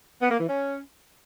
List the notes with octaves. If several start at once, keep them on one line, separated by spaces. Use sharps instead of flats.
B3
A#3
E3
C#4